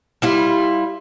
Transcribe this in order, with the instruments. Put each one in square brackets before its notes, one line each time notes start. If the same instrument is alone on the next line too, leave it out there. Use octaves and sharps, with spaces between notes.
[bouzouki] G3 E4 F4